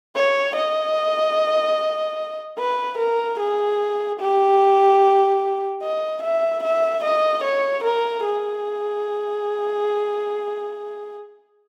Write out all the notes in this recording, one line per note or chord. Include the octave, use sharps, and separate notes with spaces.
C#5
D#5
B4
A#4
G#4
G4
D#5
E5
E5
D#5
C#5
A#4
G#4